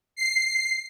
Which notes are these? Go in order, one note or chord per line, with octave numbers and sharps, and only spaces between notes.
C7